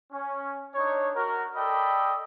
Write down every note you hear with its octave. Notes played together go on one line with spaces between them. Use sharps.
C#4
D4 D#4 C#5
F#4 A#4
A4 D5 D#5 G5 B5